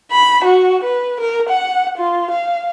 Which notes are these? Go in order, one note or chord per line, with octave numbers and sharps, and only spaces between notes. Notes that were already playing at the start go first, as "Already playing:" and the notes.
B5
F#4
B4
A#4
F#5
F4
F5